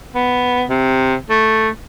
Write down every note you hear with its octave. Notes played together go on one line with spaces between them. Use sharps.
B3
C3
A3